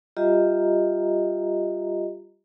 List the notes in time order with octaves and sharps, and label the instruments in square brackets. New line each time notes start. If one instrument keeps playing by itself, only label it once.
[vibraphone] G3 F4 G4 D#5 E5 A#5